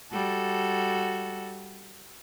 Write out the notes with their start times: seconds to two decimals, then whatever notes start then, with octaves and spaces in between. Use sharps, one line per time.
0.12 G3 F#4 A4